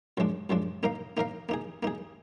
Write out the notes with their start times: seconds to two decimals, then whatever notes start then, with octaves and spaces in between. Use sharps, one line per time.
0.17 F#2 F3 G#3 D4
0.50 F#2 F3 G#3 D4
0.83 A#3 D#4 A#4 F5
1.17 A#3 D#4 A#4 F5
1.49 A#3 D#4 G#4
1.83 A#3 D#4 G#4